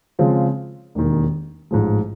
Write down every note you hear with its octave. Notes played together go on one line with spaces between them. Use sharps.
C#3 F3 G#3 C4 F4
E1 D#2 D#3
A1 G#2 F3 G#3